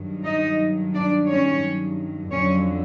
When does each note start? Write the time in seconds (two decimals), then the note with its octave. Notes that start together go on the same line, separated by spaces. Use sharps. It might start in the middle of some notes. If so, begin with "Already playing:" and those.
Already playing: G2 D#3 F#3
0.24 D#4 D#5
0.94 D4 D5
1.28 C#4 C#5
2.32 F2 D3 F#3 C#4 C#5